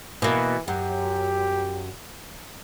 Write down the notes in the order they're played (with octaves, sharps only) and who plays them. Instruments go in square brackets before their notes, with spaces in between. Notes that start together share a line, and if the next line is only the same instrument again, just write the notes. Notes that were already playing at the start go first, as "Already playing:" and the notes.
[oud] B2 A#3 [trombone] E3
[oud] F#2 [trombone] G4